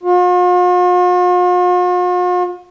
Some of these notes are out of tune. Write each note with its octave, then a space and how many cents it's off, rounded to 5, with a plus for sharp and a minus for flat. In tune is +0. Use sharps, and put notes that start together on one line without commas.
F4 +45